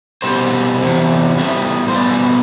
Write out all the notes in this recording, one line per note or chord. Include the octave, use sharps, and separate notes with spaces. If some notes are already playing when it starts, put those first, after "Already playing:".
B2 G3 C4 C5
E2 C3
A2 G3 B3 E5
C5
B2 G3 B3 D5